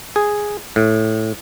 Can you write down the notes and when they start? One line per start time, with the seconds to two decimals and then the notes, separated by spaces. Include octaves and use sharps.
0.16 G#4
0.76 A2